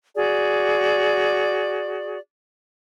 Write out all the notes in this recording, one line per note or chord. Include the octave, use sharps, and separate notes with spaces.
F#4 G#4 D5